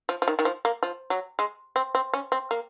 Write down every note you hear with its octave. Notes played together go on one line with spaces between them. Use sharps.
F3
F3
D#3
D#3
F3
A#3
F3
F#3
G#3
C4
C4
C#4
C4
A#3